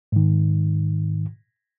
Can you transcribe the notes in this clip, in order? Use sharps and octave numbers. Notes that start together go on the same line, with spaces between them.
G#2 D#3